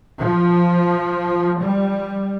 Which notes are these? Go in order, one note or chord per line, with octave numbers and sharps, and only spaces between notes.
F3
G3